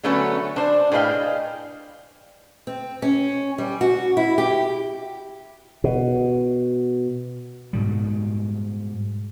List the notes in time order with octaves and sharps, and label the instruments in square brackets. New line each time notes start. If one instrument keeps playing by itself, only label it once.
[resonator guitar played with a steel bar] D3 F#3 A3 B3 C#4 B4
D4 C5
A2 G#4 B4 D#5 F5 G5
[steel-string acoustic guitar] C4
C#4
G3
F#4
E4
G4
[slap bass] B2
G#2 B2 G3